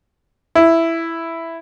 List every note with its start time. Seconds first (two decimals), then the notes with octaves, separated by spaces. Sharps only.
0.55 E4